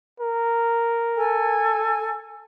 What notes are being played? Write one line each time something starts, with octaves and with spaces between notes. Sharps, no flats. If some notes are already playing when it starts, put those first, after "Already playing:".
A#4
A4 G#5